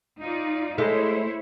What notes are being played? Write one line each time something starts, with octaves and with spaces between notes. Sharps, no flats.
D#4 F4 D5
G#3 A3 E4 C5 C#5